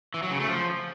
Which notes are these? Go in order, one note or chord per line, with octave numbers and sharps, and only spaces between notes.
E3
F#3
C#3
A3
F3